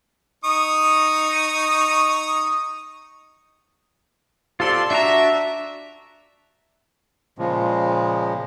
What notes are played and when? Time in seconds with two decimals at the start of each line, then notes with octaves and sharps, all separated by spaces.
0.44 D#4 C#6 D#6
4.60 C4 F4 G4 A4 D5 C6
4.91 D4 F#4 E5 A#5
7.39 A#2 C#3 F3 G#3